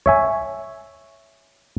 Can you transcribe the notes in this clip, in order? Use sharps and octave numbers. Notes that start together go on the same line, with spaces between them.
C#5 E5 G#5